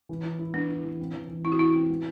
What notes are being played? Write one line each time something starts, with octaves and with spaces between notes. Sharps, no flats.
E3
E4
E4
B3 D4
E4
E3
C4
E3
E3
C4 E4
F#4
E3 E4
C4
B3